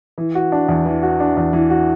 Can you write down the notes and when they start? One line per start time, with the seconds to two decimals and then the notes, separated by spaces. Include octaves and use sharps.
0.18 E3
0.35 F#4
0.52 D4
0.69 E2
0.86 E3
1.03 F#4
1.20 D4
1.37 E2
1.53 E3
1.70 F#4